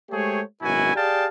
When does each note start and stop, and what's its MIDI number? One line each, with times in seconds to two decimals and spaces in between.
0.10 0.41 56
0.10 0.41 57
0.10 0.41 67
0.10 0.41 68
0.10 0.41 72
0.10 0.41 73
0.61 0.94 32
0.61 0.94 42
0.61 0.94 47
0.61 0.94 64
0.61 0.94 66
0.61 0.94 80
0.94 1.25 67
0.94 1.25 68
0.94 1.25 74
0.94 1.25 77
0.94 1.25 79
0.94 1.25 81